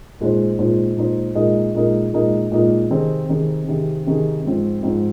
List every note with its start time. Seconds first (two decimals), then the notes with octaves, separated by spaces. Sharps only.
0.20 A#2 G#3 D#4 C5
0.58 A#2 G#3 D#4 C5
0.97 A#2 G#3 D#4 C5
1.35 A#2 G#3 D#4 A#4 D#5
1.75 A#2 G#3 D#4 A#4 D#5
2.13 A#2 G#3 D#4 A#4 D#5
2.51 A#2 G#3 D#4 A#4 D#5
2.90 C3 D#3 C4 D#4 G#4
3.29 C3 D#3 C4 D#4 G#4
3.67 C3 D#3 C4 D#4 G#4
4.06 C3 D#3 C4 D#4 G#4
4.45 G#2 F3 C4
4.83 G#2 F3 C4